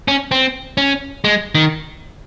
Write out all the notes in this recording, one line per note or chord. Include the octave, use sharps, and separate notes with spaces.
C#4
C4
C#4
G#3
D#3